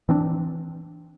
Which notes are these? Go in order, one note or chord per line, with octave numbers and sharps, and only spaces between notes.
E3 C4 D4